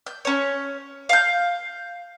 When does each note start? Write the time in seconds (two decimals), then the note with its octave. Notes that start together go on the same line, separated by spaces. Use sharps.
0.07 G6
0.25 C#4 C#5
1.09 F5 G6